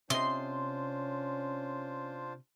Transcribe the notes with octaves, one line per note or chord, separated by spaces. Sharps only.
C3 C#4 D4 F4 C5 D#5 C6